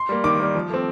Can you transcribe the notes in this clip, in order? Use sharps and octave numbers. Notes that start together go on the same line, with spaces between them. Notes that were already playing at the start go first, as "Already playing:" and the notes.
Already playing: C6
G3 A#3
D#3 D6
G3 A#3
F3
A3 C4